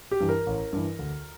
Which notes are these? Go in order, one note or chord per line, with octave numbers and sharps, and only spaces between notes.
G4
G2 E3
A#4
A1
G2 E3
D2